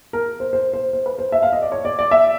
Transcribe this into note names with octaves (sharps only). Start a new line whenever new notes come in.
A#4
C5
C5
C5
C5
B4
C5
E5
F5
D#5
D5
C#5
D5
D5
E5